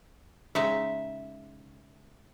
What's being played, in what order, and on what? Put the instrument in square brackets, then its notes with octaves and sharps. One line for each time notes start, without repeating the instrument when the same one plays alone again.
[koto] C#3 G#3 D#4 [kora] E5